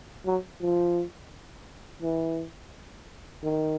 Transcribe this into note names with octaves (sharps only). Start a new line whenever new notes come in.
F#3
F3
E3
D#3